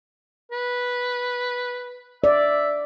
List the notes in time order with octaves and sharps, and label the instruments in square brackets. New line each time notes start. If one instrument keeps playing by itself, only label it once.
[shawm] B4
[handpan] D5 [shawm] E5